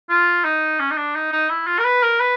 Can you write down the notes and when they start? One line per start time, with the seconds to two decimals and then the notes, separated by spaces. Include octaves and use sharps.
0.10 F4
0.44 D#4
0.80 C#4
0.91 D#4
0.97 D4
1.15 D#4
1.32 D#4
1.49 E4
1.67 F4
1.79 A#4
1.85 B4
2.03 A#4
2.20 B4